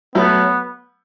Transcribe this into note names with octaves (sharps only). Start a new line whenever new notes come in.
F#3 A3 B3